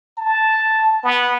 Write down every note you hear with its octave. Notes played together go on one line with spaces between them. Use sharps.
A5
B3